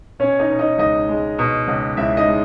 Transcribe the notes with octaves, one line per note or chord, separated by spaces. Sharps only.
B2 C#4 C#5
D#4 D#5
B2
D#4 D#5
C#2 D#4 D#5
G#3
B2
C#2
C#2 E4 E5
D#4 D#5
G#3